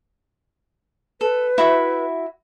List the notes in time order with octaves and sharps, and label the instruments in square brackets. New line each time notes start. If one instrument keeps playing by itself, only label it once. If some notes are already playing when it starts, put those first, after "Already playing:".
[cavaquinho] A4 [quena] B4
[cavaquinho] E4 F#4 E5